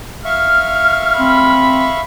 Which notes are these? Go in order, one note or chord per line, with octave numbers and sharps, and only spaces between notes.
E5 F5 C#6 F6
C4 B5